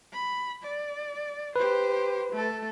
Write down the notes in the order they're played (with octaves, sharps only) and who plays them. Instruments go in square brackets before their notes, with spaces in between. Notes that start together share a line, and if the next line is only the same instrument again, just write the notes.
[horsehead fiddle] B5
D5
[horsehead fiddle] G4 C5 [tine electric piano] B4
[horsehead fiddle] A3 A4